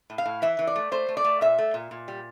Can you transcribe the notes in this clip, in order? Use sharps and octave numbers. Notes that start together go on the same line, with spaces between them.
A2
F5
A2
E3 E5
E3
D5
A3
A3 C5
A3
D5
A3
A#2 E5
A3
A#2
A#2
G3